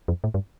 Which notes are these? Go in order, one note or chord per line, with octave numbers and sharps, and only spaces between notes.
F2
A2
G2